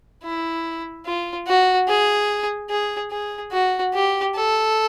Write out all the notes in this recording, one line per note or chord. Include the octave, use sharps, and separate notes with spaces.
E4
F4
F#4
G#4
G#4
G#4
F#4
G4
A4